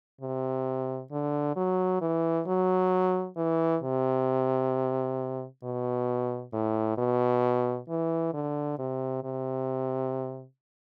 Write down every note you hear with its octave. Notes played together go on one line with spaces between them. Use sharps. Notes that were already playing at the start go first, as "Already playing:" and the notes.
C3
D3
F#3
E3
F#3
E3
C3
B2
A2
B2
E3
D3
C3
C3